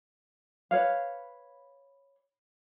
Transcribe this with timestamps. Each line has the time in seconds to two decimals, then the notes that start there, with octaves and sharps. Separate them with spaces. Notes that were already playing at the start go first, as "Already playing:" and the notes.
0.71 B4 C#5 F5